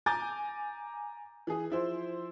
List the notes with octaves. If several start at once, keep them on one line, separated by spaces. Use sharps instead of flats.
G#5 A#5 D6 G6 A6
E3 G#4
F3 E4 C5